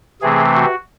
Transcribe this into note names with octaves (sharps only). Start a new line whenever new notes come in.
C3 E3 A3 C4 G#4
F#4